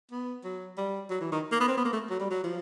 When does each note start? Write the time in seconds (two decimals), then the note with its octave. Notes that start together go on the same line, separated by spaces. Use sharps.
0.11 B3
0.44 F#3
0.78 G3
1.10 F#3
1.21 E3
1.32 D#3
1.52 A#3
1.61 B3
1.68 C4
1.77 B3
1.85 A#3
1.93 A3
2.10 F#3
2.20 G3
2.31 F#3
2.44 F3